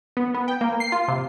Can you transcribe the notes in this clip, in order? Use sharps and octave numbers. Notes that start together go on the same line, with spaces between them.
B3
B3
G5
A#3
C7
F4
C3